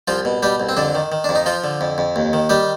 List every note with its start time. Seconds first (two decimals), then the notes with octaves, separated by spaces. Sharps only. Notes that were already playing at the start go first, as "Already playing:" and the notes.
0.08 C2 F3 F4
0.25 B2
0.43 B2 G3 G4
0.60 C2
0.69 C4
0.77 F2 D3 D4
0.95 D#3
1.12 D#3
1.24 F2 D4
1.35 D#4
1.46 F3 F4
1.64 D3
1.81 F2
1.98 F2
2.16 D#2
2.33 D#3
2.49 D#3 G3 G4